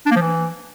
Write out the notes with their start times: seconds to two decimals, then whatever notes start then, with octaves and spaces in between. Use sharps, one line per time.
0.06 D4
0.11 A#3
0.16 F3
0.21 E3